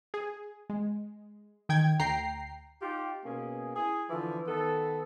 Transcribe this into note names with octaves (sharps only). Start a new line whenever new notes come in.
G#4
G#3
D#3 G5 G#6
D2 G5 A#5 C7
D#4 F4 G4
B2 A#3 C#4 G#4
E4 G#4 G#5
D3 E3 F3
D#3 B3 A4